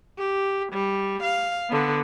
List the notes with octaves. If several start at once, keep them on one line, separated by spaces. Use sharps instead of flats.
G4
G3
F5
D3 B3